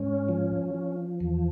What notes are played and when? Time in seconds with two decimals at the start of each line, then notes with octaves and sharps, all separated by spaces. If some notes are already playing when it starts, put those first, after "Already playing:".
Already playing: G#2 C#4
0.29 F3
0.74 F3
1.21 E2